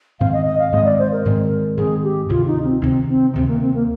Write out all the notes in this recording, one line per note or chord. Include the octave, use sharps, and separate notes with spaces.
G#2 D#3 G#3 C4 F5
D#5
D#5
F5
G#2 D#3 G#3 C4 D#5
D5
C5
A#4
G#2 D#3 G#3 C4
G#2 D#3 G#3 C4 G#4
G4
D2 C3 D#3 F4
D#4
C4
D2 C3 D#3 C4
C4
D2 C3 D#3 C4
A#3
C4
A#3